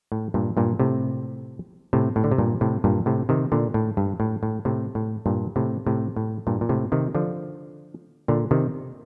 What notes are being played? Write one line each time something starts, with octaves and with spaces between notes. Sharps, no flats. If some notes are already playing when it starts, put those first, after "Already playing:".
A2
G2 A#2
G2 A#2
A2 C3
A2 C3
A2
D3
C3
G2 A#2
A2 C3
G2 A#2
A2 C3
C3 D#3
A#2 D3
A2
G2
A2
A2
A2 C3
A2
G2 A#2
A2 C3
A2 C3
A2
G2 A#2
A#2
A2 C3
C3 D#3
D3 F3
A#2 D3
C3 D#3